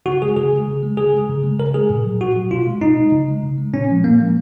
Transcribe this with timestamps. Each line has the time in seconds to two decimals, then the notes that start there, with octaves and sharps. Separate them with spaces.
0.05 C#3 F#4
0.22 G#3 G#4
0.36 C#3 G#4
0.53 G#3
0.68 C#3
0.83 G#3
0.97 C#3 G#4
1.13 G#3
1.29 C#3
1.43 G#3
1.59 C#3 A#4
1.74 G#3 G#4
1.90 A#2
2.04 F#3
2.20 A#2 F#4
2.36 F#3
2.51 B2 F4
2.67 G#3
2.81 B2 D#4
2.97 G#3
3.12 C#3
3.28 G#3
3.43 C#3
3.58 G#3
3.73 A#2 C#4
3.89 F3 G#3
4.04 A#2 A#3
4.20 F3 G#3